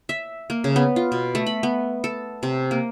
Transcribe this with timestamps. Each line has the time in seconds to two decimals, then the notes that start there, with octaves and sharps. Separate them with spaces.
0.09 E5
0.50 A#3
0.64 C#3
0.76 B3
0.96 F4
1.12 B2
1.35 A3
1.46 B5
1.63 B3
2.04 A4
2.43 C3
2.71 A#3